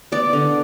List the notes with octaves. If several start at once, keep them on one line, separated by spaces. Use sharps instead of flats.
B3 D5
D3